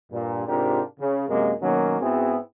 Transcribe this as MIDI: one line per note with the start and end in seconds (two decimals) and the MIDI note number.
0.12 0.44 43
0.12 0.44 46
0.48 0.81 44
0.48 0.81 48
0.48 0.81 62
0.48 0.81 65
0.48 0.81 67
0.48 0.81 70
1.00 1.26 49
1.29 1.52 42
1.29 1.52 48
1.29 1.52 56
1.29 1.52 58
1.62 1.98 47
1.62 1.98 51
1.62 1.98 54
1.62 1.98 58
1.62 1.98 61
2.00 2.37 44
2.00 2.37 59
2.00 2.37 60
2.00 2.37 64
2.00 2.37 66
2.00 2.37 68